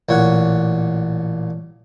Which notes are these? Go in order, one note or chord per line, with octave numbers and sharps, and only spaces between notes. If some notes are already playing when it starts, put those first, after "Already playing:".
A1 A#2 C#5 F#5